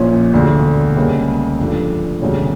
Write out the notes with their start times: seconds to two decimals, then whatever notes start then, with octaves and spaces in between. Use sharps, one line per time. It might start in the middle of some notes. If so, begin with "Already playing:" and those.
Already playing: A#1 A#2 F3 C#4
0.33 E1 D2 D3
0.96 C#2 C#3 G3 A#3 C#4
1.59 G2 F3 A3 D4
2.22 E1 D2 C#3 G3 C#4